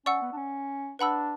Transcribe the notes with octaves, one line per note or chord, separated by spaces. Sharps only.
C#4 D5 F#5 C#6 E6
B3
D4
C#4
D4 B4 F#5 B5 E6